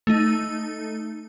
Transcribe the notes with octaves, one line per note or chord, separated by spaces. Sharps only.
A3 D#4